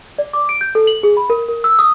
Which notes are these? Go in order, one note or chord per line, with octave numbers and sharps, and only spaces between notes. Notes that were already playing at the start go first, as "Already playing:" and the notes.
D5
D6
D7
G6
A4
F#7
G#4
B5
A#4
A#4
E6
D#6